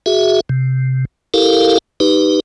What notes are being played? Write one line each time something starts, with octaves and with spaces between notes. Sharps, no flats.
F#4 G#4 E5
C3
E4 G4 A4 A#4 F5
D#4 G4 B4